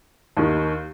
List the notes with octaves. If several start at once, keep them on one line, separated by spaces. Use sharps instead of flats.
D#2 D#3